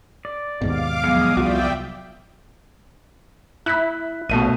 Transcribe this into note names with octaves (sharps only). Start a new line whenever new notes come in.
D5
D#2 G#2 B2 F5 D6
E2 F3 F#3 G#3 B3 F5 D#6
C2 G3 F4 F#4 D5 E5 G5
E4 F#6 B6
A#1 B2 A3 D#7